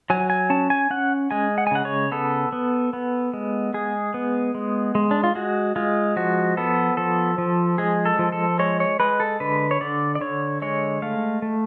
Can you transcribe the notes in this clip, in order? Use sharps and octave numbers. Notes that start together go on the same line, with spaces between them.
F#3 G#5
G#5
C#4 A5
G#5
C#4 F#5
G#3 G#5
F#5
G#5
C#3 F#5
C#5
B3 A4
B3
B3
G#3
G#3 G#4
B3
G#3
G#3
D4
F4
G#3 F#4
G#3 F4
F3 F#4
B3 A4
F3 A4
F3
G#3 G#4
A4
F3
A4
G#3 C#5
C#5
G#3 B4
A4
D3 B4
C#5
D3 D5
D5
D3 C#5
G#3 C#5
A3 F5
A3